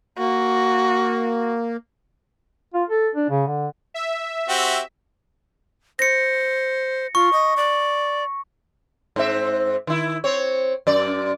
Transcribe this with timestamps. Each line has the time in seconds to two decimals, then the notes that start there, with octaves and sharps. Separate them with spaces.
0.18 A#3 F#4
2.74 F4
2.89 A4
3.15 D4
3.30 C#3
3.47 D3
3.94 E5
4.49 C4 F#4 G4
5.99 C5 A#6 C#7
7.15 F4 C#6
7.33 D#5
7.57 D5
9.16 G#2 C4 E5
9.87 D#3 E4
10.24 C4 C#5
10.87 F#2 D5